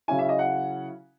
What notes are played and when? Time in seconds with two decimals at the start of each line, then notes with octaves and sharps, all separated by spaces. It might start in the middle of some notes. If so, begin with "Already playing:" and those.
0.08 C#3 F#3 C#4 E4 G#5
0.19 E5
0.29 D#5
0.39 F#5